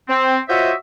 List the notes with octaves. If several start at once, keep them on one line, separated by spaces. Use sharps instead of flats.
C4
F4 F#4 C5 C#5 D#5 E5